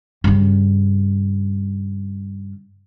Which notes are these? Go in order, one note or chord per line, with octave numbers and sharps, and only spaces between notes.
G2 C#3